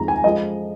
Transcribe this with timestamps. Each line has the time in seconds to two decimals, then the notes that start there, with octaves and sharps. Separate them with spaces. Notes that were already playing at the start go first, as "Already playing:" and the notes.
Already playing: F2 D#3 G#3 A#5
0.08 G#5
0.24 F3 G#3 D#5